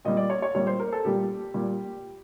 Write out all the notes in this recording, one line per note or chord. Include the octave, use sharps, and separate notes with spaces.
A#2 G3 D#5
D5
C#5
C#5
A#2 G3 C#5
C5
A#4
A4
A#2 G3 G4
A#2 G3